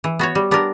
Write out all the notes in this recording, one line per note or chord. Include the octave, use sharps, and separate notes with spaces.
E3
B3 F#4 C#5
G3
B3 D4 G4 A#4